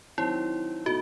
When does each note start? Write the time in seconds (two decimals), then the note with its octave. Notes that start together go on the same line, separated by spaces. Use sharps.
0.17 D#3 F#3 C4 E4
0.86 B2 A3 D#4 F#4